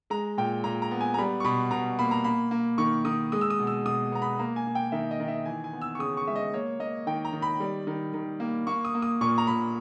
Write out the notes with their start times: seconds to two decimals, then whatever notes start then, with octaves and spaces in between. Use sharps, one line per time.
0.10 G#3 A#5
0.38 A#2 G5
0.64 A#2 A#5
0.82 A#5
0.91 B3
1.01 G#5
1.14 A#5
1.18 G3 B5
1.40 C#6
1.44 B2 B5
1.71 B2 A#5
1.99 A#3 B5
2.11 A#5
2.24 A#3 B5
2.51 A#3
2.78 D#3 C#6
3.05 D#3 D#6
3.32 G#3 D#6
3.41 E6
3.50 D#6
3.59 B2
3.67 E6
3.85 B2 D#6
4.12 B3 A#5
4.22 B5
4.39 A#3 A#5
4.56 G#5
4.66 A#3
4.75 G5
4.92 D#3 E5
5.11 D#5
5.20 D#3
5.28 E5
5.45 E3 G#5
5.64 G#5
5.73 B3
5.81 E6
5.95 C#6
5.99 C#3 D#6
6.17 C#6
6.27 G#3 E5
6.36 D#5
6.54 A#3 C#5
6.80 A#3 D#5
7.07 D#3 G5
7.25 A#5
7.33 D#3
7.42 B5
7.60 G3
7.87 D#3
8.14 D#3
8.40 A#3
8.67 A#3 C#6
8.85 D#6
8.95 A#3
9.02 D#6
9.21 A#2 C#6
9.38 A#5
9.47 A#2 B5